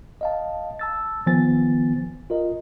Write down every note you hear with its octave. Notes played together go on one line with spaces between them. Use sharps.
D#5 F5 A5
A5 E6 A6
D#3 F3 B3 C5 G#5 A6
F4 A#4 D#5